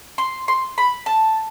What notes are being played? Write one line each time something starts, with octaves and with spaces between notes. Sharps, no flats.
C6
C6
B5
A5